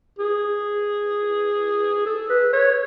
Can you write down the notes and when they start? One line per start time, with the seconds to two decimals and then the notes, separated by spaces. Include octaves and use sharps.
0.19 G#4
2.06 A4
2.29 B4
2.53 C#5